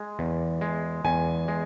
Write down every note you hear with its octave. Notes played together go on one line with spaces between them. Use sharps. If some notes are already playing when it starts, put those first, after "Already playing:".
Already playing: G#3
E2
G#3
E2 G#5
G#3